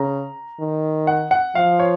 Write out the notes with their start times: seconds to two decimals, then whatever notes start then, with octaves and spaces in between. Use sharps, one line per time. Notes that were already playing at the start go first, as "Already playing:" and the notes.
Already playing: C#3 A#5
0.60 D#3
1.07 F#5
1.31 F#5
1.55 F3 F5
1.79 C#5